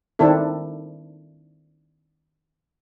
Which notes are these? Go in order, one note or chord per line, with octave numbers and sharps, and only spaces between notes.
D#3 C4 D4 E4 A4